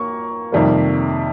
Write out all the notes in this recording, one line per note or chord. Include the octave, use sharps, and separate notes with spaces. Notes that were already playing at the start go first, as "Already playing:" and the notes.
Already playing: A#3 C#6
F2 C3 D#3 G3 A#3